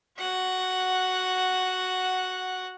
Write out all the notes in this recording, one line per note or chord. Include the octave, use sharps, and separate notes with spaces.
F#4 F#5